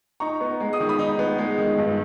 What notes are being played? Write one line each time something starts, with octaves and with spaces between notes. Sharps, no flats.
D#4 A#5 C#6
B3
G#3
D#6
D#3
B5 D#6
D#4
B3
G#3
D#3
G2